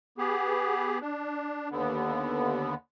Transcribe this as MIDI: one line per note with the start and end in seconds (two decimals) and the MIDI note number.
0.18 0.99 59
0.18 0.99 67
0.18 0.99 68
1.01 1.69 62
1.71 2.74 39
1.71 2.74 50
1.71 2.74 59